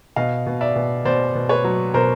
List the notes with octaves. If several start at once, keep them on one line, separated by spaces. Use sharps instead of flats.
B2 D#5 F5
B2
D5 E5
B2
B2 C5 D5
B2
B4 C#5
F#3
B2 A#4 C5